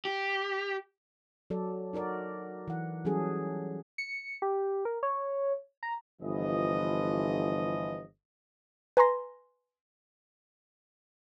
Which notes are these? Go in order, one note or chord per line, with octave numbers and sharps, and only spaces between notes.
G4
F#3 A4 D5
D#4 F#4 A#4 D5
E3 F#5
E3 F#3 G3 C#4 G#4 A4
C#7
G4
A#4
C#5
A#5
G1 E3 F3 D#5
B4 G#5 A#5 C6 A#6